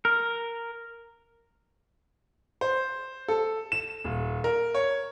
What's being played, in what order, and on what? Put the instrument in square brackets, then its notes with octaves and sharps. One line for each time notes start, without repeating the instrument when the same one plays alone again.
[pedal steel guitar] A#4
[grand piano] C5
A4
E7
D#1
A#4
C#5